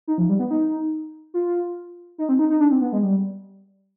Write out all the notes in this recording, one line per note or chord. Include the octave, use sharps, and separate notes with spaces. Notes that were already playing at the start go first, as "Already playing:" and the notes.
D#4
F3
G3
B3
D#4
F4
D#4
C4
D#4
D#4
D4
C4
B3
G#3
G3